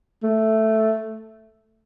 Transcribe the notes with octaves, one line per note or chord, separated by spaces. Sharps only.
A3